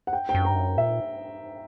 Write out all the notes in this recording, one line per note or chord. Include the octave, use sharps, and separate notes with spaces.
F#5
G5
G5
F#2
G2 A#5
F#2
A#2 E5